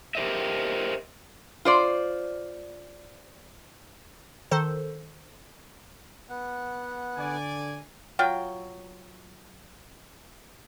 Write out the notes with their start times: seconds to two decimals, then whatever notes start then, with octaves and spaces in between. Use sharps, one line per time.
0.15 G4 A#4 C5 D#5 E5
1.65 F4 C5 D5
4.51 D#3 A4 C5
6.30 B3 F#5
7.17 D3 D5 G#5
8.19 F#3 F4 G5